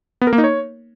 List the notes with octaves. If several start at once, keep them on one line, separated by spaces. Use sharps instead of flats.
B3
A#4
A#3
D#4
C#5